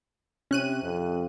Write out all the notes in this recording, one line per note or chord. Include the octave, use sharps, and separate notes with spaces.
C3 C#4 F#6 D#7
F2